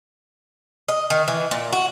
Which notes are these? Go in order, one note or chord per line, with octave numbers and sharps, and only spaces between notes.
D#5
D#3
E3
A#2
F#4